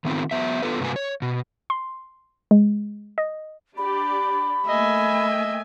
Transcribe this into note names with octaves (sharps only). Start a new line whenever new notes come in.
D#3 A3 B3 C4 D#4 F4
F#3 B3 E5
B3 F4 A4 B4
G2 C3 A#3 F#4 B4 G#5
C#5
B2
C6
G#3
D#5
D4 G4 D5 B5
A3 A#3 D#5 E5 G#5